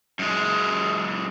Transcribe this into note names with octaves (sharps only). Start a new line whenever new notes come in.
F#2 G#3